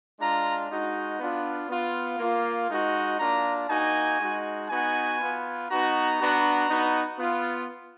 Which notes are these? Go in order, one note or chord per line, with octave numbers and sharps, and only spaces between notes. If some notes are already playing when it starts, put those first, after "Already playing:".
G#3 D4 F4 A#5
G#3 D#4 F#4
B3 D4 F4
B3 F4
A#3 F4
G#3 D#4 F#4
A#3 D4 F4 A#5
A#3 D#4 F#4 G#5
G#3 D#4 F#4
B3 D#4 F#4 G#5
B3 F4
B3 D#4 F#4 A#5
B3 D4 F#4
B3 D#4 F#4
B3 F4